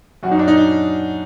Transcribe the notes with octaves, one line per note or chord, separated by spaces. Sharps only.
F#2 F#3 D#4 F#4
D4
D#4